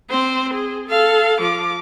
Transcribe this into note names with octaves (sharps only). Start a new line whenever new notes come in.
C4 C5
G#4
A4 F5
F3 D6